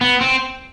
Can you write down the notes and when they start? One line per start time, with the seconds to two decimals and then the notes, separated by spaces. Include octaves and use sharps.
0.01 B3
0.21 C4